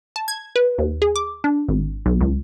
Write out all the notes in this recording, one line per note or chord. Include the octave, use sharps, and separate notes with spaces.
A5
G#6
B4
D#2
G#4
D6
D4
G#1
B1
C#2